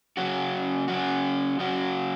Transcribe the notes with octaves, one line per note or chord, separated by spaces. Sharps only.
C#3 F#3 C#4 F#4
C#3 F#3 C#4 F#4
C#3 F#3 C#4 F#4